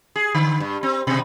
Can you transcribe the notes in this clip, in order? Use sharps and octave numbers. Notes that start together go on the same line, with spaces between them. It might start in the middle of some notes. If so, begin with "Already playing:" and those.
G#4
D3
G2
C4
B2